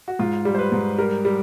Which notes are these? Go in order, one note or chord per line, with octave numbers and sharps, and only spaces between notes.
F#4
G#2 F4
G3
C5
B4
G#2
G3 A#4
G3